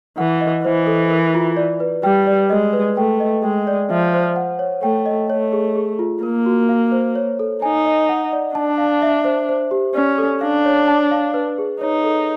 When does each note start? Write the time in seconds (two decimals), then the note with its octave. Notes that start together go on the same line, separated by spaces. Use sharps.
0.18 E3 F#5
0.41 D#5
0.64 E3 C5
0.87 A4
1.10 A#4
1.34 F4
1.57 D5
1.80 B4
2.03 G3 G5
2.27 D5
2.50 G#3 D#5
2.73 B4
2.97 A3 G5
3.20 D#5
3.44 G#3 G5
3.67 D5
3.90 F3 E5
4.14 C5
4.36 F#5
4.59 C#5
4.83 A3 G5
5.06 D#5
5.30 A3 C#5
5.52 G#4
5.75 G#4
5.99 F4
6.23 A#3 A#4
6.46 F#4
6.69 F5
6.92 C5
7.15 C#5
7.39 A4
7.62 D#4 G#5
7.86 D#5
8.09 F#5
8.33 D5
8.55 D4 A5
8.78 F5
9.02 E5
9.24 C5
9.49 C5
9.71 G4
9.95 C#4 D5
10.18 A4
10.41 D4 F5
10.65 C#5
10.88 A5
11.11 F5
11.34 B4
11.58 G#4
11.81 D#4 C#5
12.04 A4